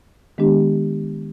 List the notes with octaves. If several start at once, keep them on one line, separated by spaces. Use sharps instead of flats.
D#3 G#3 B3 D4 G4